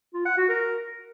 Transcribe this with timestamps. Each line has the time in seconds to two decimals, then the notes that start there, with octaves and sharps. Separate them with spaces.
0.14 F4
0.25 F#5
0.37 F#4
0.49 A#4